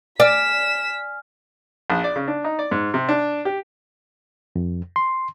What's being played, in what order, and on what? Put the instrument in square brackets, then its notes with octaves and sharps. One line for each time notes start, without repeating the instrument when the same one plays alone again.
[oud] D5 [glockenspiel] G#5 F6 [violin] B6 E7
[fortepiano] A#1
D5
C#3
D4
D#4
D5
G#2
C3
D4
G4
[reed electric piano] F2
C6